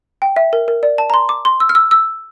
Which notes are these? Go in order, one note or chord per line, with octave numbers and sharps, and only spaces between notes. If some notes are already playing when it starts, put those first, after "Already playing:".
G5
E5
A#4
A#4
D5
A5
A#5
C6
D6
C6
E6
F6
E6
E6